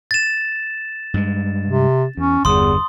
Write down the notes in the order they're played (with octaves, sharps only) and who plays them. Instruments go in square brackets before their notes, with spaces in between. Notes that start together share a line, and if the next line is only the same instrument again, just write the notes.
[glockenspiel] A6 E7
[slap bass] G2 G#3
[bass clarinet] C3
[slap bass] E2 [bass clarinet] C#4
[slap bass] G1 G2 [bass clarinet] E2 [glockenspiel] C6 D#6